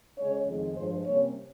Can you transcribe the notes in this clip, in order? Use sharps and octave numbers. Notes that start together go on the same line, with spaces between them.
C#3 G#3 C#4 C#5
F2 D#3 G#3
G2 F3 G#3 C5
C3 G3 A#3 C#4 C#5